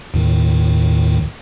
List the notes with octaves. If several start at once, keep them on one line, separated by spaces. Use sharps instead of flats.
D#2 A2 D#3